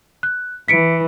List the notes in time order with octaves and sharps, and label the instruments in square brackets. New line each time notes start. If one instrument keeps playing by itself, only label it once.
[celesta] F#6
[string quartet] E3 [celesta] B6 C#7 D7